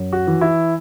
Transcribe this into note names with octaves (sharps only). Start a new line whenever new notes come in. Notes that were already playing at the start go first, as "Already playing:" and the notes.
Already playing: F#2
F#4
E3
E4